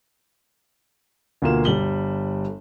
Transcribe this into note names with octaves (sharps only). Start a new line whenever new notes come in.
D2 B2 A#3 F4 E7
G1 G3 F#7 G7